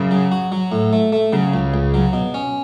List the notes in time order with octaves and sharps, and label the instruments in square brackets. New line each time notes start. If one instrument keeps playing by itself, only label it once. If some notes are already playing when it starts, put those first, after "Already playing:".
Already playing: [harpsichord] F#2 [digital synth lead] C#3
[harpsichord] F#3
F#4
F#3
A2
A3
A3
[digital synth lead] C#3 [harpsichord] F#3
[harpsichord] C#2
C#2
F#3
B2
C#4